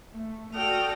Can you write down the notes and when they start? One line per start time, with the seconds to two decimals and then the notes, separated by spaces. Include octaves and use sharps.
0.13 A3
0.54 F#4 A4 D5 G5 D#6 F6